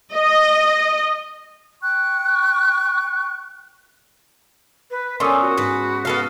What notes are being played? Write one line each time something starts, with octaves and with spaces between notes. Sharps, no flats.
D#5
G5 C#6 F#6
B4
A#2 B3 C#4 A4 C6 C#6 D#6
F#4
G#2 B4
B3 A4 F5